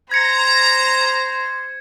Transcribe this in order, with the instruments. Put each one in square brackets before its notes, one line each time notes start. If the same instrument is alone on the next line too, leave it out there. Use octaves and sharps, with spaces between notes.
[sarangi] C5 [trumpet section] A#5 [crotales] G#6 C#7